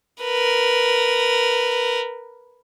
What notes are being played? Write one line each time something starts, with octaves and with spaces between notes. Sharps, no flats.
A#4 B4